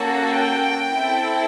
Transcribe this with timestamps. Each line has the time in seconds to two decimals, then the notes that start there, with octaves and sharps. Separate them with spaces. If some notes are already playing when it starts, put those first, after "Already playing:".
Already playing: A#3 C#4 F#4 A4
0.28 G5
0.92 C4 E4 A4